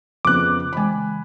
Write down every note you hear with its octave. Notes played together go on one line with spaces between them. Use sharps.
F2 C#3 B3 D6 F#6
C#3 E3 G#3 G#5 B5